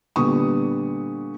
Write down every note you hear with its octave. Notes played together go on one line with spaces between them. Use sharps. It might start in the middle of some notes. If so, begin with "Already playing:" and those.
A#2 D3 G3 B3 C#6 D#6